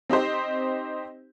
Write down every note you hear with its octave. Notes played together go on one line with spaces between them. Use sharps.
C4 D#4 G4 C5